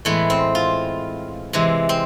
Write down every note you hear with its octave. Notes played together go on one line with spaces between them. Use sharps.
A2 E3 G#3 B3
C4
F4
C3 E3 G#3
C4